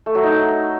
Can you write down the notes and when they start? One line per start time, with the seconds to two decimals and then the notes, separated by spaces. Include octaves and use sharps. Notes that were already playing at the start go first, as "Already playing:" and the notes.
0.06 A3
0.15 F#3
0.24 D#4